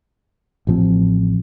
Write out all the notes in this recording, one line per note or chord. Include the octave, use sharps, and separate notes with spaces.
A1 A2 F3 C4